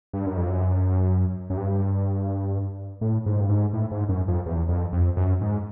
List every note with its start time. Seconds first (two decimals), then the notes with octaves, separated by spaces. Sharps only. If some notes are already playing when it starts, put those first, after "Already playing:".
0.13 G2
0.26 F#2
0.37 F2
0.49 F#2
1.50 F#2
1.57 G2
3.01 A2
3.26 G#2
3.40 G2
3.49 G#2
3.73 A2
3.91 G#2
4.09 F#2
4.28 F2
4.46 E2
4.69 F2
4.93 F2
5.17 F#2
5.41 G#2